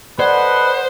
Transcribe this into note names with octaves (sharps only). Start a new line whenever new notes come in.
A4 B4 C5 D5 D#5 F#5